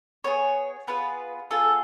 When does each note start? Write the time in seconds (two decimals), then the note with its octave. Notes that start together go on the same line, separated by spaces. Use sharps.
0.24 B3 F4 G#4 C#5
0.87 B3 F4 G#4 B4
1.51 B3 F4 G#4 A4